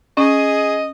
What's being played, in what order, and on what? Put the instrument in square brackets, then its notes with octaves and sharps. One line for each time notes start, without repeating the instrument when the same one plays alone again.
[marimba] C#4 [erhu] G#4 [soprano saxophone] D#5